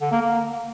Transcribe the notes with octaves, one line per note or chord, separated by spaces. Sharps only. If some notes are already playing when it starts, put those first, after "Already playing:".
D3
A#3
A#3